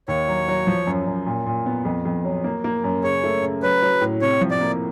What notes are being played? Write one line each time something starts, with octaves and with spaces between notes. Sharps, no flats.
D#2 C#5
F#3
F#3
F3
F#2
F#2
A#2
A#2
B3
F2
F2
F#3
A#3
A#3
F#2
C#3 C#5
A3
C#3
F#3 B4
F#3
A2
C3 C#5
F3
D5
A#3